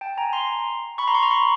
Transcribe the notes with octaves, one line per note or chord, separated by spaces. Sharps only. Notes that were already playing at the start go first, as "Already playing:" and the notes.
G5 A5
G#5 A#5
A#5 C6
B5 C#6
A#5 C6
B5 C#6
A#5 C6
B5 C#6